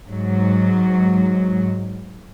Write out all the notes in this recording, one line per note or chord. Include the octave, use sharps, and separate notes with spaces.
G#2 F#3